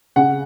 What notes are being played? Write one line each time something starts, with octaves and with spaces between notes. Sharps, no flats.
C#3 F#5